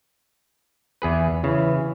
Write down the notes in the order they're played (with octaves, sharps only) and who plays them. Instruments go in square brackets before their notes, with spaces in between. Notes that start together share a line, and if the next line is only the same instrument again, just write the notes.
[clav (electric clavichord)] E2 G#4 B4
[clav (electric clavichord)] C#3 [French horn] E3